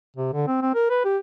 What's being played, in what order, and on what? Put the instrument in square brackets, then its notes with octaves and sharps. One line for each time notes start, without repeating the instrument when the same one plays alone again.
[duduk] C3
D3
C4
C4
A#4
B4
G4